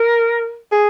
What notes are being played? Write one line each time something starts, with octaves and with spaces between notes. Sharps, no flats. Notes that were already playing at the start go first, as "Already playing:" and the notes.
Already playing: A#4
G#4